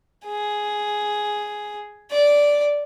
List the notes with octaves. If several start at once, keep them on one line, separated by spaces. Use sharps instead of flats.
G#4
D5